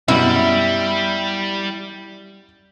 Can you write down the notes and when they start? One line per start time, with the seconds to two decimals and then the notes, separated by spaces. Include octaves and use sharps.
0.08 F#2 B2 G3 E4